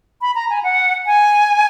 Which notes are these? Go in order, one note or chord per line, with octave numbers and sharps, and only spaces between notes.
B5
A#5
G#5
F#5
G#5